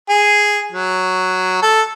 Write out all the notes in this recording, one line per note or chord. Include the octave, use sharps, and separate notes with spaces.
G#4
F#3
A4